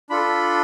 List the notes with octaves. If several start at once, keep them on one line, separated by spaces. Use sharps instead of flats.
D4 F4 A4 B5